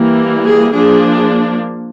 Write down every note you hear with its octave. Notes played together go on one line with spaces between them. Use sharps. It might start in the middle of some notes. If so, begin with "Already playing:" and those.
Already playing: E3 G3 A#3
G#4
F3 A#3 D4 G#4